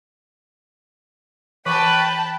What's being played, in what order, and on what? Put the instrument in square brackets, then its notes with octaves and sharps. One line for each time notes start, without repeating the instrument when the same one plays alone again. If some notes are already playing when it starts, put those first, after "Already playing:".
[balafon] E3 C#6 [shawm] B4 [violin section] G5 A5 B5